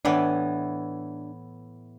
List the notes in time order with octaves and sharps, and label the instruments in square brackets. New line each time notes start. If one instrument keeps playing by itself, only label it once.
[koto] A2 E3 B3 [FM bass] D4